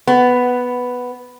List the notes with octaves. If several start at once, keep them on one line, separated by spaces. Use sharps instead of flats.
B3